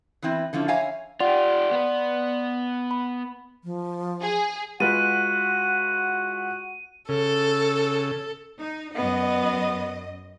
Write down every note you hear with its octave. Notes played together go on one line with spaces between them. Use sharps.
E3 B3 C4 E4
D3 F3 C#4 E4
C#5 E5 F5 G#5 A#5
F4 G4 D5 F#5 C6
B3 B4
B5
F3
G#4
G#3 F4 F#4 B4 F#5 D#7
C#3 A4
D#4
F#2 B3 D#5